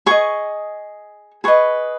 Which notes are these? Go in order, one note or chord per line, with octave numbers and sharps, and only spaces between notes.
G#4 D#5 C#6
G#4 B4 D#5 C#6